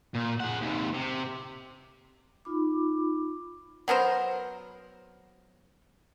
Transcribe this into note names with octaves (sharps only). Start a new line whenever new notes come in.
A#2
G#4 F#5
D#2 C3
C3
D#4 F4 B5 D6
F#3 B3 A#4 C5